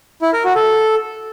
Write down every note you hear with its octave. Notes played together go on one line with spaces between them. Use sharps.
E4
A#4
F#4
A4